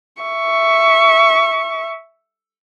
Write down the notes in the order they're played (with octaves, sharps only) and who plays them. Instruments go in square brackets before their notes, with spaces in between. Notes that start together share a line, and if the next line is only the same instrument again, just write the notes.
[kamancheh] E5 C#6